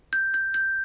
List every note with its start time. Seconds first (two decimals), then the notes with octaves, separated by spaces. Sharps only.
0.13 G6
0.34 G6
0.54 G6